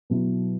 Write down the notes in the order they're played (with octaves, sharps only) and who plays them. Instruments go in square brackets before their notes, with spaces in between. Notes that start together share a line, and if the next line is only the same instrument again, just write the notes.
[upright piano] B2 F#3 B3 E4